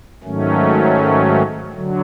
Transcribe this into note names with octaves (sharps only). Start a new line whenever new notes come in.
G#2 D#3 F#3 A3 C#4
D3 F#3